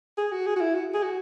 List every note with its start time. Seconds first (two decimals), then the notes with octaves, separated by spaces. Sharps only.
0.18 G#4
0.32 F#4
0.46 G#4
0.56 F#4
0.61 E4
0.75 F#4
0.94 G#4
1.03 F#4